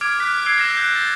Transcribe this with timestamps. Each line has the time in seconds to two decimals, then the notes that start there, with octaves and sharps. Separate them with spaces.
0.01 D6 F6 G#6 D7
0.20 F6 F#6 B6
0.46 E6 G#6 C7 D7
0.58 E6 A#6 E7
0.75 F#6 G6
0.96 A6